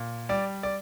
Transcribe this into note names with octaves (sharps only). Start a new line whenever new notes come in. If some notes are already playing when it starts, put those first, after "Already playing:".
Already playing: A#2
G3 D5
D5